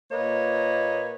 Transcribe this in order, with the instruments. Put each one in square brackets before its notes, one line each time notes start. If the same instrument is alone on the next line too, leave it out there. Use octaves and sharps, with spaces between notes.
[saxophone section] A#2 A#3 B4 C#5 D#5